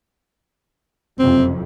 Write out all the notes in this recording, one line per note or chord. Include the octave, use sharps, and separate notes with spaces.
F#1 F2 C3 C4